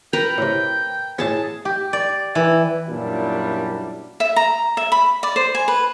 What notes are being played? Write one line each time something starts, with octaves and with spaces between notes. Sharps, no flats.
A#4 B4 G5 A#5
A2 C3
A2 B3 G#4 A5
G4
D5
E3
F#2 A#2 F#3 G3 D4 E4
E5
A#5
E5
B5
D5
C5
G#5
B4